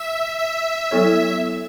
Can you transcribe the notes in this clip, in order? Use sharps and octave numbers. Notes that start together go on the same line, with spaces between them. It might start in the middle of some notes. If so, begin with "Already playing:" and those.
Already playing: E5
E5
F#3 B3 E4 A4 C#5